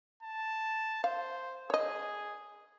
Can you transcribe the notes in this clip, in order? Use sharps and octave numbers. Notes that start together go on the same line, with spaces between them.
A5
C5 F5
G#4 C#5 D#5